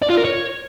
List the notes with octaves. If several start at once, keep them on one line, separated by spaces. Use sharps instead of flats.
D5
F4
A#4
C#5